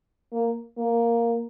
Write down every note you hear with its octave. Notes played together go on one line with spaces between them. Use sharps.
A#3
A#3